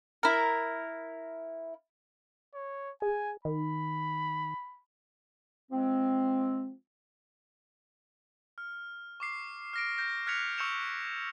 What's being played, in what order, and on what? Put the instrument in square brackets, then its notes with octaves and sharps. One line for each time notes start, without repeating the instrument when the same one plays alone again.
[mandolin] E4 A#4
[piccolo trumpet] C#5
[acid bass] G#4 [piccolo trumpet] G#5
[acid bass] D#3 [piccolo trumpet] B5
[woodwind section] F3 G#3 C4
[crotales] F6
C#6 D6 C7
F6 A#6 D7
G6 A#6
F6 F#6 G#6 B6 C#7 F7
C#6 E6 G6 C#7 E7 F7